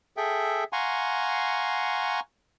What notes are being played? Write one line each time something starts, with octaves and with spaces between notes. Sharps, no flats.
G#4 A4 E5 G5
F5 F#5 G#5 A#5 C6 C#6